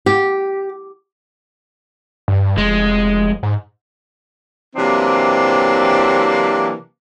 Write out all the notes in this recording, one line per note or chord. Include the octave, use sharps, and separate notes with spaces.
G4
G2
F1 G#3
G#2
C3 E3 F#3 A#3 C4 D4